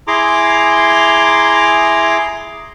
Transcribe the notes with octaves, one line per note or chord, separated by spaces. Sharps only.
E4 G#4 A#5 C6 D6